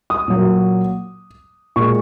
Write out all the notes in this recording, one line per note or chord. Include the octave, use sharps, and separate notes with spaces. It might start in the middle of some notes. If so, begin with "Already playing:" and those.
D#6
A#2 F#3 A#3
A#2 G#3 C#6